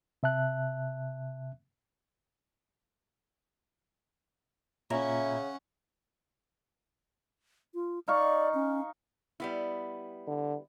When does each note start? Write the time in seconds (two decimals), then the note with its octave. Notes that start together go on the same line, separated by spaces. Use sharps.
0.23 C3 E5 A5 F#6
4.90 A#2 C#3 C#4 E4 F#5 A#5
7.74 F4
8.08 D#4 D5 F5 C#6
8.54 C#4
9.40 G3 B3 E4
10.28 D3